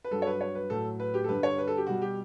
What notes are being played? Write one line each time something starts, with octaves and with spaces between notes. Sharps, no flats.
B4
G2 F#3 A4
C#5
B4
C#5
B4
A2 F#3 A4
B4
G4
A4
G2 D3 G3 B4
C#5
B4
A4
G4
B2 G3 F#4
G4